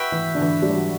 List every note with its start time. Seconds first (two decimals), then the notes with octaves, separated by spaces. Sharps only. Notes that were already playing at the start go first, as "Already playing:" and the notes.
Already playing: F#4 B4 E5 G5
0.12 E3
0.35 D3
0.41 E3
0.62 G3
0.70 F#3